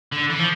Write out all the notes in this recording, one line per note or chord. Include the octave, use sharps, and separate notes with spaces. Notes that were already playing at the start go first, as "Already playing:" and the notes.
D3
E3
F3